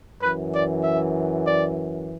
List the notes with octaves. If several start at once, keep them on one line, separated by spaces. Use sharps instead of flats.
F#2 E3 B4
D5
E5
D5